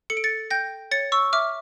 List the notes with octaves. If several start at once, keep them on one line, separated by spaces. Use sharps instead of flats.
A4 C#7
D7
A6 C#7
G5 G6 A#6
C#5 A6 C#7
C#6 E6
E5 D6 F6